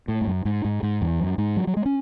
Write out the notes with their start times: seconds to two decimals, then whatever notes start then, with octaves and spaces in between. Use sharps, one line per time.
0.08 A2
0.21 G#2
0.27 F#2
0.45 G#2
0.65 G#2
0.83 G#2
1.02 E2
1.20 F#2
1.38 G#2
1.57 F#3
1.67 F#3
1.77 G#3
1.86 C#4